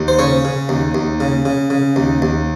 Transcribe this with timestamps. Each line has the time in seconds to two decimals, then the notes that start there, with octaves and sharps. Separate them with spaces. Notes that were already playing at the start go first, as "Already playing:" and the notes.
Already playing: D#2
0.08 C5
0.19 C#3 C#5
0.45 C#3
0.69 D#2
0.95 D#2
1.20 C#3
1.45 C#3
1.70 C#3
1.96 D#2
2.22 D#2